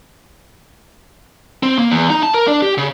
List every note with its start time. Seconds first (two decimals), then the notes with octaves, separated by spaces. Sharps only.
1.63 C4
1.79 A#3
1.91 E2
2.10 D#4
2.23 A5
2.34 A#4
2.47 D4
2.62 G4
2.78 C#3